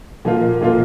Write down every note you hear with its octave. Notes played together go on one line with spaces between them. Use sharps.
A#2 F3 A#3 F4
A#2 F3 A#3 F4